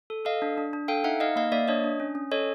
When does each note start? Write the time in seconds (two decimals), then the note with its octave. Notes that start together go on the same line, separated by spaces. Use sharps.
0.10 A4
0.25 A4 D#5 F5
0.42 D4
0.58 D4
0.73 D4
0.88 A4 F5 G5
1.04 D#4 E5 F#5
1.20 D#4 D#5 F5
1.36 A#3 D#5 F5
1.52 A#3 D5 E5
1.68 D4 C#5 D#5
1.84 D4
2.00 C#4
2.15 C#4
2.31 A4 C#5 D#5